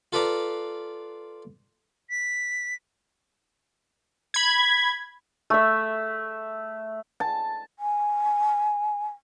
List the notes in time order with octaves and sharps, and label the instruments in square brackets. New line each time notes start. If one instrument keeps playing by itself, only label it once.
[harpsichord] F4 A4 B4 D5 F5 A#5
[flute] B6
[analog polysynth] B5 G#6
[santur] A3 E5
[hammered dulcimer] A5
[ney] G#5